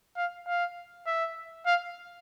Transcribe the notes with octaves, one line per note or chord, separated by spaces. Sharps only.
F5
F5
E5
F5